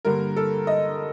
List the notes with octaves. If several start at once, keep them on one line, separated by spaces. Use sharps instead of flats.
G2 D3 G3 A#3 A#4
A4
D#5